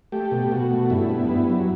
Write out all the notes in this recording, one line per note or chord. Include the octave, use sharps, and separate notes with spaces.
A3 G4
B2
B2 F#4
A3
G2 E4
B3
G2 E4
F#3